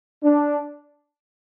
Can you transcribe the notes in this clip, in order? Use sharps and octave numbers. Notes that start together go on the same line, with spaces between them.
D4